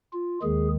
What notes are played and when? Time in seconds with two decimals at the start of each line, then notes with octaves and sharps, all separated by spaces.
0.13 F4
0.42 D#2 D#3 G#3 G#4